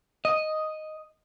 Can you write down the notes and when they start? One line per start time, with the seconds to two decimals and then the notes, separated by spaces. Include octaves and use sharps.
0.25 D#5